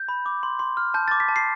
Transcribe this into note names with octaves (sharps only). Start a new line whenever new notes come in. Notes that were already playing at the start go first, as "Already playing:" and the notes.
Already playing: G6
B5
D6
C6
C6
F6
A5 G6
D6 A6
B6
A5
C7